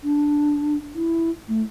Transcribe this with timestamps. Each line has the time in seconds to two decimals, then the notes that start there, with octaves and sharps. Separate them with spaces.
0.04 D4
0.95 E4
1.49 A3